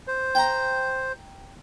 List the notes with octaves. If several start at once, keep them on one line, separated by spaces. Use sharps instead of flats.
C5
G5 A#5